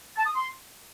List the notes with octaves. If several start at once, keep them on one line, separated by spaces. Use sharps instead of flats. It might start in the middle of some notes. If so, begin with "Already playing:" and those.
A5
D#6
C6